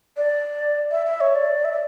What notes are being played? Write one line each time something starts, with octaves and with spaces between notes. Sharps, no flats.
D5
E5
E5
C#5
D5
E5
D5